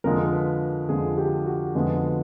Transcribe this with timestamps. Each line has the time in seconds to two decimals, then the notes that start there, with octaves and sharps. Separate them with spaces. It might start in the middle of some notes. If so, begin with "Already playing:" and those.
0.04 F2 D3 F3 G#3 A#4
0.32 B4
0.89 F2 D3 F3 G#3 G#4
1.18 G4
1.46 F#4
1.75 F2 D3 F3 G#3 B3